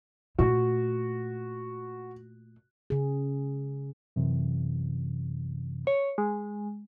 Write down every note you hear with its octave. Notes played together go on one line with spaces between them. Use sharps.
A#2 A3 F#4
C#3 G#4
F#2 C3 E3
C#5
G#3